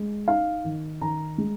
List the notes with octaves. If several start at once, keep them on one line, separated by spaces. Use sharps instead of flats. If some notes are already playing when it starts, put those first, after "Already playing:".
Already playing: G#3
D#4 F5
D#3
D#3 A#5
G#3